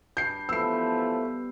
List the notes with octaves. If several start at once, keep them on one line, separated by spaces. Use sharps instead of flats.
G2 A5 G6 C7
E3 F3 A3 B3 E6 C7